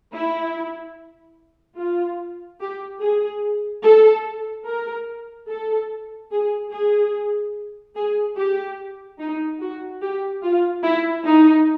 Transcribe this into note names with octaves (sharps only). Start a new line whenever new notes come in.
E4
F4
G4
G#4
A4
A#4
A4
G#4
G#4
G#4
G4
D#4
F#4
G4
F4
E4
D#4